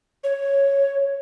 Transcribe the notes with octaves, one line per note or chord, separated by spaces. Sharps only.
C#5